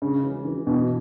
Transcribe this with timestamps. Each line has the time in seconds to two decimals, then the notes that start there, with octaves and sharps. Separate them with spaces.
0.02 C#3 G#3
0.23 E3
0.45 E3
0.67 B2 E3